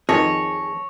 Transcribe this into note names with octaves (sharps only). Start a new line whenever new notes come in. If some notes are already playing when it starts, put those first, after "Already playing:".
F2 D#3 G#4 C#5 A5 A#6